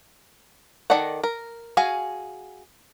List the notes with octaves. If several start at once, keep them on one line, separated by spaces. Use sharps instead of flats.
D#3 A4 D5 D#5 F#5
A#4
F#4 G#4 F5 G#5